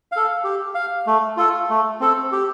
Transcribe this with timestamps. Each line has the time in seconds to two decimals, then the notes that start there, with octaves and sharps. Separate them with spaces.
0.12 A4 F5
0.44 G4
0.75 F5
1.07 A3
1.37 F4 A4
1.70 A3
2.01 C4 A4
2.32 G4